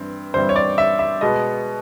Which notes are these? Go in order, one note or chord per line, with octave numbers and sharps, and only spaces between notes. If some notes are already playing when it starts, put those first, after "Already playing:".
Already playing: G2 E3 C4
G2 E3 G3 C4 C5
C#5
D5
E5
E5
B2 G#3 B3 D#5